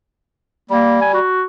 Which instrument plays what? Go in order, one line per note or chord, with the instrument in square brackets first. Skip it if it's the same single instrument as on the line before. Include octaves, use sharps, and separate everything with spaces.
[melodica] G3 [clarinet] A#3
[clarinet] G#5
F#4